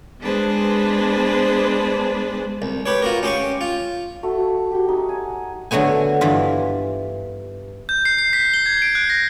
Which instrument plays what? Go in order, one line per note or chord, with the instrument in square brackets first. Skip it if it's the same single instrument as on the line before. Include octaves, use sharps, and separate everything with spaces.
[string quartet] G#3 B3 D4 G#4 B4 C5
[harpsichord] C2
G4 B4 C#5
F4 F#4 A#4
C#4 G4 C6 C#6
F4
[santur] A3 F#4
F#4 G4
D#4
G#5
[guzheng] D3 F#3 A3 B3 G#5
G2 E3 F4
[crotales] G6
C7
C7
B6
G7
G#6
D7
F#6
A#6